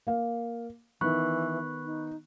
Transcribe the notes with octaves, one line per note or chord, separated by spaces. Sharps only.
A#3 F5
D#3 E3 B3 B5 C#6 F#6
D#4